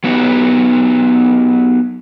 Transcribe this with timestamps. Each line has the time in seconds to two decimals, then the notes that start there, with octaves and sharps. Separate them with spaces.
0.04 F#3 B3 D#4 G4